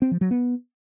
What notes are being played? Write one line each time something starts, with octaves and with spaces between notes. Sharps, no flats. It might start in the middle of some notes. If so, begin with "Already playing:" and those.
C4
F3
F#3
B3